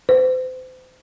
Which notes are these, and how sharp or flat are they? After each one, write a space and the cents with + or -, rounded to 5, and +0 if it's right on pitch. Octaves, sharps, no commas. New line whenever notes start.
C5 -35